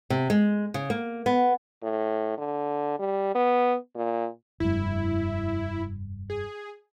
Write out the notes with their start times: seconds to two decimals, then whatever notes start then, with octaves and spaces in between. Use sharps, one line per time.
0.10 C3
0.30 G#3
0.74 C#3
0.90 A#3
1.26 B3
1.83 A2
2.38 D3
2.99 G3
3.35 B3
3.96 A#2
4.60 F1 G2 E4
6.30 G#4